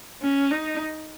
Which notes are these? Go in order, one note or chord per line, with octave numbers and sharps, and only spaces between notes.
C#4
D#4